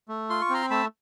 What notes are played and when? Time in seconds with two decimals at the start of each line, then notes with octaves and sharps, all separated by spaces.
0.08 A3
0.29 F4 C6
0.41 C#6
0.50 C4 A#5 C6
0.70 A3 A5 B5